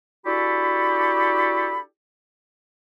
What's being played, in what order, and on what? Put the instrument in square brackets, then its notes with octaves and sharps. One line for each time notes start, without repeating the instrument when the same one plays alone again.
[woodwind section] D4 E4 F#4 G4 A4 B5